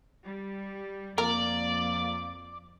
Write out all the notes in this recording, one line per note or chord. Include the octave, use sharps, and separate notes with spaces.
G3
F2 A#3 A#4 D5